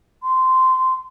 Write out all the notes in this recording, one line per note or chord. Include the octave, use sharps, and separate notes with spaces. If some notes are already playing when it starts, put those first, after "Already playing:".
C6